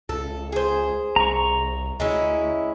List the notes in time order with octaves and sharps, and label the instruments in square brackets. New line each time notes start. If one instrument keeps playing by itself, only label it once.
[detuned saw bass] C#2 [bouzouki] A4
[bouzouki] G#4 C5
[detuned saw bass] C2 [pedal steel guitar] A#5 C#6
[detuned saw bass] D2 [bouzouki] G#3 C#4 E4